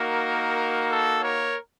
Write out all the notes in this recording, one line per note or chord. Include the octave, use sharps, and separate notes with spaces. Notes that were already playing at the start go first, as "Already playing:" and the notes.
Already playing: A#3 D#4 F#4 A#4
A4
A#4 C#5